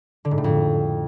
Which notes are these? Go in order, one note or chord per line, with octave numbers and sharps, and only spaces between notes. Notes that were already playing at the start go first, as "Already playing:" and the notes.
D3
G#2
A2
F2